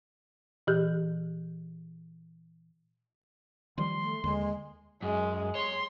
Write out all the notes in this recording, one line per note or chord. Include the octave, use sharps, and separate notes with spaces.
A#2 E3 G4 G6
D#3 F3 G3 C6
A3
D#2 D3 G#3
F#2 G#3
C#5 C6